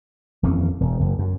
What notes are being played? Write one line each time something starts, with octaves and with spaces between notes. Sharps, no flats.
D#1 F2 E3 C#4
E1
F#1
F#2